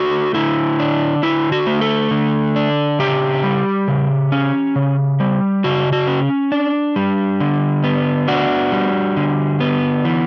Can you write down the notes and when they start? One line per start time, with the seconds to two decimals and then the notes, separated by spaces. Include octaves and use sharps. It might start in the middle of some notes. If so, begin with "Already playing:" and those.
Already playing: D3 A3 F#4
0.34 D3 E4
0.80 D4
1.23 D3 E4
1.52 F#4
1.67 A3
1.81 A4
2.11 D3
2.56 D4
2.99 C#3 G4
3.44 G3
3.88 C#3
4.32 C#4
4.76 C#3
5.20 G3
5.64 C#3 F#4
5.93 F#4
6.07 C#4
6.52 D4
6.96 G3
7.40 D3
7.84 B3
8.28 D4 F#4
8.72 G3
9.17 D3
9.60 B3
10.05 E3